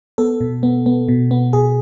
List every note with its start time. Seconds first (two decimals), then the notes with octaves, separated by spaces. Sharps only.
0.18 B3 A4
0.41 B2
0.63 B3
0.86 B3
1.08 B2
1.31 B3
1.53 B2 G#4